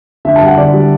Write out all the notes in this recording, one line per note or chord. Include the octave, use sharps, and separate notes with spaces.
D3 E5
G3 A5
F#5
D3 D5
G3